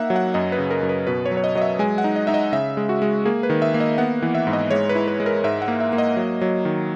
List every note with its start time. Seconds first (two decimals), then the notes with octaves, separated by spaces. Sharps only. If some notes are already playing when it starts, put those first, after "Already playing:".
Already playing: A#3 D#4 E5 F#5
0.10 F#3
0.16 F#5
0.34 F#2 D#5
0.52 B4
0.58 C#3
0.70 A#4
0.83 F#2
0.89 B4
1.07 B2 B4
1.26 C#5
1.31 F#3
1.37 C#5
1.44 D#5
1.55 F#3 D#5
1.62 E5
1.79 G#3 G#5
1.98 F#5
2.04 D#4
2.16 D#5
2.27 D#4 E5
2.34 D#5
2.52 C#3 E5
2.77 G#3
2.89 F#4
3.02 G#3
3.25 A#3 G#4
3.43 B4
3.50 D#3
3.62 E5
3.74 A#3
3.80 D#5
3.98 B3 F#5
4.22 E3
4.35 E5
4.47 G#2
4.53 D#5
4.71 G#3 C#5
4.89 B4
4.95 E4
5.08 B4
5.20 G#3
5.26 A#4
5.44 G#2 E5
5.62 F#5
5.68 A#3
5.80 E5
5.93 A#3
5.98 D#5
6.17 F#3
6.42 F#3
6.65 D#3